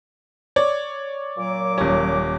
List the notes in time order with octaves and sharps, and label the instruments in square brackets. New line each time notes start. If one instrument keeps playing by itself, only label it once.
[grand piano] C#5 D5
[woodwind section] A#2 F#3 D6
[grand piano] D#1 C#4